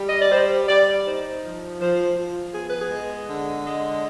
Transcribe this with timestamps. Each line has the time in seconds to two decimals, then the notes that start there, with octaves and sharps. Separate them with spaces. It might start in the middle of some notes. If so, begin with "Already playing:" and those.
Already playing: G3
0.09 D#5
0.20 D5
0.31 G3 C5
0.68 G3 D5
1.05 D#4 C5
1.43 F3
1.79 F3 C5
2.17 F3
2.54 B3 G#4
2.67 B4
2.80 G#4
2.91 G#3
3.28 D3
3.66 G#3